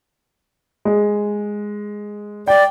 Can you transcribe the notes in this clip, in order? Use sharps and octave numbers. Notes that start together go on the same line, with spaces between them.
G#3
D5 G5